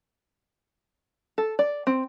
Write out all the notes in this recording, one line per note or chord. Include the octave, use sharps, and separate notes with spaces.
A4
D5
C4